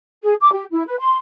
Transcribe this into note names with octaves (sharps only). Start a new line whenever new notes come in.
G#4
D6
G4
E4
B4
C6